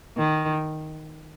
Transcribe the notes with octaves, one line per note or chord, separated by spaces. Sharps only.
D#3